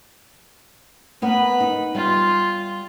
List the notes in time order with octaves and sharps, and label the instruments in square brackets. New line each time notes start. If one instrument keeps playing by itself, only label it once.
[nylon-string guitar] A#3 B3 A#4 [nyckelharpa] B4 B5
[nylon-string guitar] D#4
[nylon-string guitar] G3 [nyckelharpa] F4